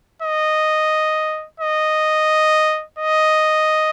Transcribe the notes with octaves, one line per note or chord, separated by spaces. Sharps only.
D#5
D#5
D#5